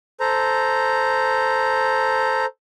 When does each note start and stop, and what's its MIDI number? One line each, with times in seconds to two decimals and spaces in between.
0.20 2.46 69
0.20 2.46 72
0.20 2.46 82